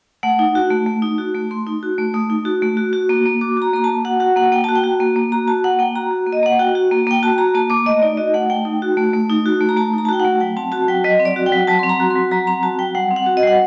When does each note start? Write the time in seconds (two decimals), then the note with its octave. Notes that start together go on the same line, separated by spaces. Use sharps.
0.23 A3 F#5
0.39 D#4
0.55 F#4
0.71 A3
0.86 A3
1.02 D#4
1.18 F#4
1.35 A3
1.51 A3 C6
1.67 D#4
1.83 F#4
1.98 A3
2.14 A3 D#6
2.30 D#4
2.45 F#4
2.62 A3
2.77 F#4
2.93 F#4
3.09 A#3
3.26 A#3
3.41 F#4 D6
3.57 F#4 A#5
3.73 A#3 A#5
3.84 A5
3.89 A#3
4.05 F#4 F#5
4.20 F#4 F#5
4.36 A#3 F#5
4.52 A#3 G5
4.64 F#4 A5
4.75 G5
4.84 F#4
5.00 A#3
5.16 A#3
5.32 F#4 A#5
5.48 F#4 A5
5.64 A#3 F#5
5.79 A#3 G5
5.95 F#4 A#5
6.11 F#4
6.27 A#3
6.33 D#5
6.43 A#3 F#5
6.59 F#4 G5
6.75 F#4
6.91 A#3
7.07 A#3 G5
7.23 F#4 A5
7.38 F#4 A#5
7.54 A#3 A5
7.70 A#3 D6
7.86 A3 D#5
8.02 D#4 D5
8.17 F#4 D#5
8.34 A3 F#5
8.50 A3 G5
8.65 D#4
8.82 F#4
8.97 A3
9.13 A3
9.29 D#4
9.46 F#4
9.61 A3
9.69 A#5
9.77 A3 A5
9.93 D#4 A#5
10.05 A5
10.09 F#4 G5
10.20 F#5
10.25 A3
10.40 F#3 G5
10.57 C4 A5
10.72 F#4 A5
10.88 F#3 G5
11.04 F#3 D#5
11.20 C4
11.25 D5
11.36 F#4
11.46 G5
11.52 F#3
11.67 F#3 A5
11.79 C4 C6
11.89 A#5
12.00 F#4
12.11 C6
12.16 F#3
12.31 F#3 A#5
12.47 C4 A#5
12.63 F#4 A5
12.79 F#3 G5
12.95 G3 F#5
13.11 C4
13.16 F#5
13.26 F#4
13.37 D#5
13.43 G3 F#5